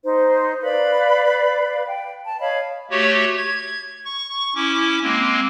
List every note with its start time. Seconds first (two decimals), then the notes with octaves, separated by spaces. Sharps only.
0.04 D#4 C5
0.62 B4 D5 F5 B5
1.87 G5
2.25 A5
2.40 C#5 D#5 F5 B5
2.91 A3 F#4 G4 C#5
3.37 G#6
4.05 C#6
4.55 C#4 E4 D6
5.03 G#3 A#3 C4